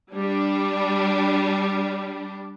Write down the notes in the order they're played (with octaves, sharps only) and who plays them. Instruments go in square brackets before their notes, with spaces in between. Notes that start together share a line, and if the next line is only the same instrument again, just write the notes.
[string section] G3 D4